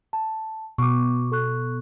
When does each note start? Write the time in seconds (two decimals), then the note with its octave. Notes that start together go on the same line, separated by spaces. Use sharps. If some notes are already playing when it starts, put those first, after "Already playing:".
0.13 A5
0.78 B2 C#6 D6
1.32 A4 C#6 F#6